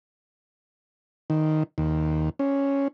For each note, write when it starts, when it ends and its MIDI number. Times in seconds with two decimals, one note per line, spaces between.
1.30 1.63 51
1.78 2.29 39
2.39 2.88 61